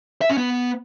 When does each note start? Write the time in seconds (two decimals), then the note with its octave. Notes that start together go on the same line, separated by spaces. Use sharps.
0.21 E5
0.29 C#4
0.38 B3